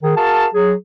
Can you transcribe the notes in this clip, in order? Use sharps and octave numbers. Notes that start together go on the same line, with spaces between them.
D#3 G#4
F#4 G#4 A#4 F5 A5
F#3 G#4